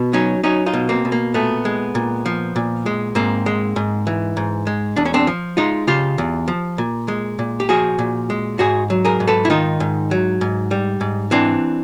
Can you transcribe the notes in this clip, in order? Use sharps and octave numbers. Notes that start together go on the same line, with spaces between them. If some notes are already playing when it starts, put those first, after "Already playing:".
Already playing: B2
F#3 C#4 D#4
F#3 C#4 D#4
D#4 F4
B2
A#3 C4
B2
A#3
A#2 A3 B3
G#3
A#2
F3
A#2
G#3
G#2 A#3 C4
G#3
G#2
E3
G#2
G#3
E2 D4
C#4
C4 D4
F3
G#3 D#4 F4
C#3 F4 G4
E2
F3
A#2
G#3
A#2
G4
F3 F#4 G#4
A#2
G#3
G#2 F#4 G#4
F#3
G#4 A#4
G#2
A4 B4
E4
D#3 D#4 F4
G#2
F#3
G#2
G3
G#2
E3 C4 D4